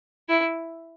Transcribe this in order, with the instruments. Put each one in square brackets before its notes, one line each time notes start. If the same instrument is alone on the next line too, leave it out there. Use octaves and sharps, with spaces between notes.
[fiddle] E4